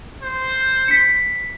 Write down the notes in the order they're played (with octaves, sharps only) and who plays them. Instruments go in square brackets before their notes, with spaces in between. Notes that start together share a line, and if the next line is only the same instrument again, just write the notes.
[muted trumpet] C5
[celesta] B6 C#7